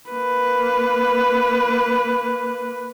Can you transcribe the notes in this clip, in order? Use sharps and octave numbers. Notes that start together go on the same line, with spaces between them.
A#3 B4